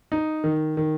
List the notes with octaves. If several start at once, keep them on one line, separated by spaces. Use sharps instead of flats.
D#4
D#3
D#3